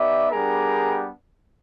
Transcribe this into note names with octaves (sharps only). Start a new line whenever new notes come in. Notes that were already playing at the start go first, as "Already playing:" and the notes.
Already playing: B3 D#4 G4 D5 E5
G3 B3 D4 G4 G#4 A#4